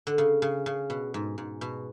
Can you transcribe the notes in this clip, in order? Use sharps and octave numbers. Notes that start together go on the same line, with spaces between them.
D3
C#3
C#3
C#3
B2
G#2
G#2
B2